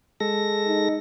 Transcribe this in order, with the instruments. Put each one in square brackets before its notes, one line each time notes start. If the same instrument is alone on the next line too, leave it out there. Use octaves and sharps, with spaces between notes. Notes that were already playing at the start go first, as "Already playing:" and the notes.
[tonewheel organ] G#3 A4 A#6
[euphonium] D#4